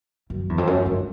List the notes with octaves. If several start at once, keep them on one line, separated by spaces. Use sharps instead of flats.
F#2
E2
F2
F#2
G2